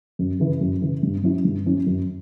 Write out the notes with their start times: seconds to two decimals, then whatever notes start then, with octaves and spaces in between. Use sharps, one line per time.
0.19 F#2
0.40 C#3 E3
0.61 F#2
0.82 C#3 E3
1.03 G2
1.23 F#3 C#4 E4
1.45 G2
1.66 F#3 C#4 E4
1.87 F#2